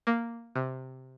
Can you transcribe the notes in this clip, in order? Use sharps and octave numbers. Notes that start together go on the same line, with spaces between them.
A#3
C3